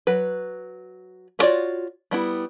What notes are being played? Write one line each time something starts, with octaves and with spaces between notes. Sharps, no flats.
F#3 B4
B3 F4 F#4 C#5 D5
G3 B3 E4